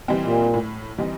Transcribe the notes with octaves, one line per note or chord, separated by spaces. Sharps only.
E3 G3 C4 D#4
A#2
A2
E3 G3 C4 D#4